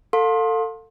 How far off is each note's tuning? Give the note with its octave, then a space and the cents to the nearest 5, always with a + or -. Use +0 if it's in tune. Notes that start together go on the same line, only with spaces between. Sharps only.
A4 +25 F5 +35 C6 +25